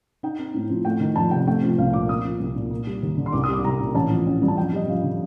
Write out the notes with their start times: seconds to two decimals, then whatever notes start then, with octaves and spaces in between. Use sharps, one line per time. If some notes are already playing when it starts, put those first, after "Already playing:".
0.23 D#4 G5
0.39 C4
0.54 A2
0.69 F3
0.85 A3 G5
1.00 D#3
1.16 F2 A5
1.31 C3 G5
1.47 A3 G5
1.63 F3
1.78 C2 F5
1.93 A#2 D6
2.09 A#3 D#6
2.24 F3
2.40 C2
2.55 A#2
2.71 A#3
2.87 G3
3.03 D#2
3.17 D3
3.26 C6
3.32 C2 D6
3.43 D#6
3.48 G3
3.53 D6
3.64 C2 A#5
3.80 A#2
3.95 A1 A5
4.10 F3
4.27 A1
4.42 G2
4.48 A5
4.56 F2 G5
4.73 G3 D#5
4.88 F2 F5
5.03 D3